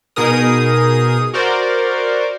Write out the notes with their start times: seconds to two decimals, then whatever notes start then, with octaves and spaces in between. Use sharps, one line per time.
0.16 B2 D#4 G#4 A#4 D#6
1.34 F#4 A#4 C5 D5